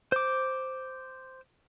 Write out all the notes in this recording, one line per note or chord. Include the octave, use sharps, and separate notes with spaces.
C5 D6